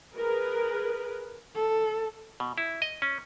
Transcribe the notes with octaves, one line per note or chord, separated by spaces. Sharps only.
G#4 A#4 B4
A4
B2
E4
D#5
C#4